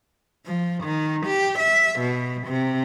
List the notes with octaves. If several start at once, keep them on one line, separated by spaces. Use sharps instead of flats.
F3
D#3
G4
E5
B2
C3